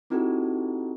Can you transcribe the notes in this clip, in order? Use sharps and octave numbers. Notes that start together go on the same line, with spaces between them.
C4 D#4 E4 F#4 G4 A4